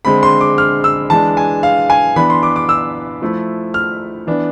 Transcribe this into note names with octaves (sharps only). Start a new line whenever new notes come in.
D3 G#3 C4 B5
C6
D6
F6
E6
E3 G#3 D4 A5
G#5
F5
G#5
E3 B3 D4 B5
C6
D6
D6
E6
F3 A3 E4
F6
E3 B3 D4